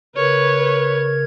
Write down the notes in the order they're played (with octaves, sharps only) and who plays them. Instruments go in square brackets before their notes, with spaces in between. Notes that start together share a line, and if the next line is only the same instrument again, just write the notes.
[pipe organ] C#3 A#4 G#6 [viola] B4 C#5